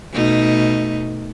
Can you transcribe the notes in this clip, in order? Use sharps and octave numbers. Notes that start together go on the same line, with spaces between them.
B2 A3 D#4